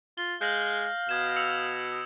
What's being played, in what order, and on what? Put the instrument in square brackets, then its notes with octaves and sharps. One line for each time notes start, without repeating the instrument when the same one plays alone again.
[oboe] F4 [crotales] G7
[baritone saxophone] G#3 [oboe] F5 [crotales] G6 A#6 F#7
[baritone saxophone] B2 [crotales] D#6 G#6 E7
[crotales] E6 C#7 F7